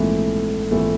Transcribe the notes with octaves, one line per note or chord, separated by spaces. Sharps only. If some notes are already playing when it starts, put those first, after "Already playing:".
Already playing: A#1 G#2 E3 A3 C4
A#1 G#2 E3 A3 C4